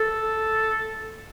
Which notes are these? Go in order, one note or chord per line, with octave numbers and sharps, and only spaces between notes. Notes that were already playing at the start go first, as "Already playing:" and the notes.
Already playing: A4